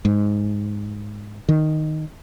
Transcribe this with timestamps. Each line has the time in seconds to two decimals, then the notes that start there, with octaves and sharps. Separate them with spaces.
0.05 G#2
1.49 D#3